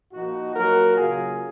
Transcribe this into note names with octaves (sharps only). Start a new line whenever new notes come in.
A#2 F3 A#3 D#4 F#4
A#2 F#3 A#3 F#4 A#4
C#3 F#3 A#3 F4 G#4